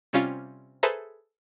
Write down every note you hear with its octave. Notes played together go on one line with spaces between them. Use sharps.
C3 G3 C#4 F4
G#4 A4 B4 C5 E5 A#5